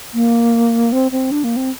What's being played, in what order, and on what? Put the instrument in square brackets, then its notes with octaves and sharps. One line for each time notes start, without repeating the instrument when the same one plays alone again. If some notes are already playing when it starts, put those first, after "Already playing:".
[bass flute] A#3
C4
C4
D4
A#3
C4